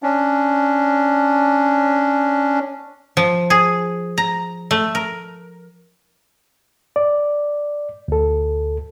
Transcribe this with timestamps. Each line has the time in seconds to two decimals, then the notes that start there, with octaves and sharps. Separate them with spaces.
0.03 C#4 D4
3.17 F3
3.50 G#4
4.18 A#5
4.71 A3
4.95 A#4
6.96 D5
8.08 D2 A4